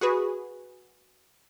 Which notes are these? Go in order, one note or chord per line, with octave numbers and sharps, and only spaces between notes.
F#4 G#4 B4